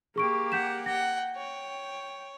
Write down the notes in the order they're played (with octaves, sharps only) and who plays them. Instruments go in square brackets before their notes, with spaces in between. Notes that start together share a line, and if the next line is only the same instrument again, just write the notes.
[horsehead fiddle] A#3 G4 [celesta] G#4 C#6 D7
[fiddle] F#5 [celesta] G6 B6 E7
[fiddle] F#5 G5 [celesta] A#6
[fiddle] C#5 [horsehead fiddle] G5